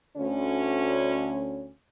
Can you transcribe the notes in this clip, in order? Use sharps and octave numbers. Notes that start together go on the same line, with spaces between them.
D2 C#4